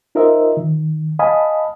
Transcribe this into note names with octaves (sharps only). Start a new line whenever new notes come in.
D#4 F4 A#4 C5 D#5 E5
D#3
D#5 F5 G#5 A5 B5 D#6